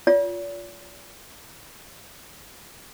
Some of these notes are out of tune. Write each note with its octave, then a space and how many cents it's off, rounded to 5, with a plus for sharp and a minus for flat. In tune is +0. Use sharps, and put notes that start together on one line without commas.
F4 +0 D5 -45